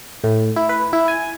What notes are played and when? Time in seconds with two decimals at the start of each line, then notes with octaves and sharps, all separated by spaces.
0.24 A2
0.56 E4
0.69 B4
0.93 E4
1.08 G#5